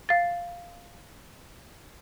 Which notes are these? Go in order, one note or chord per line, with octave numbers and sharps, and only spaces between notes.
F5 A6